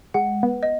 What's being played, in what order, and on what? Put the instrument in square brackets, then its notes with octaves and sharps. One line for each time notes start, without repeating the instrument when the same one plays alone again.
[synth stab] G#3 [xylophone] F#5
[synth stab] B3
[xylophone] D#5